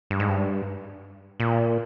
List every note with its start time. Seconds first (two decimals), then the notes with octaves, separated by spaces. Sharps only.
0.10 G2
0.20 G#2
0.29 G2
1.40 A#2